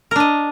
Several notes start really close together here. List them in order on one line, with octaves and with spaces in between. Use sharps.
A#4 D4 D#5